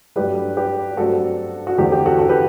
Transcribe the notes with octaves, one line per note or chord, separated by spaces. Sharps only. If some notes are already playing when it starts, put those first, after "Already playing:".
G2 F#3 A3 D4 G4 B4
G4 B4
G2 F#3 A3 C4 F#4 A4
F#4
E2 D3 A3 C4 G4
G4
F#4 A4
F#4 A4
G4 B4